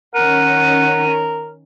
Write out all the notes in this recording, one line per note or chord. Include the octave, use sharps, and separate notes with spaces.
D#3 C#4 A#4 F#5 D#7